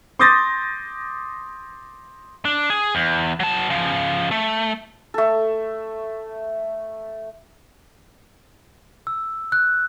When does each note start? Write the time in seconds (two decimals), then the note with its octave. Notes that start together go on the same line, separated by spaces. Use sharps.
0.19 C6 D6 D#6 G6 A6 A#6
2.45 D4
2.70 G#4
2.95 E2
3.40 F#3 A5
3.70 C#3 F3
4.31 A3
5.14 A3 A4
9.07 E6
9.52 F#6